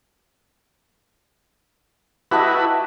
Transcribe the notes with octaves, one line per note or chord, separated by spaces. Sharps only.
E4 F#4 G4 A4 B4 D#5